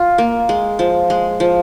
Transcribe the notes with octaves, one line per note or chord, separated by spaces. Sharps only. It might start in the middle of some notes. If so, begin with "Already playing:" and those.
Already playing: F4
A#3
G#3
F3
G#3
F3